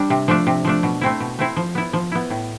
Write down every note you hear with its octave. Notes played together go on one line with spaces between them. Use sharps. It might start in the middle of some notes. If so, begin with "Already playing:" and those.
Already playing: G3 D4
C3
F3 A3 D4
C3
F3 A3 D4
B2
A3 C4 E4
B2
A3 C4 E4
F3
B3 E4
F3
B3 E4
A2